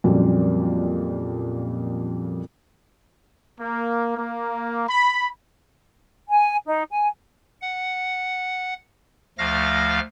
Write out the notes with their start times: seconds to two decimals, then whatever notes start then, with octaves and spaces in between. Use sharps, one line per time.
0.04 F2 A#2 C#3 F#3 G3
3.59 A#3
4.17 A#3
4.87 B5
6.28 G#5
6.66 D#4
6.90 G#5
7.61 F#5
9.38 D2 F3 A3 F5 F6 A#6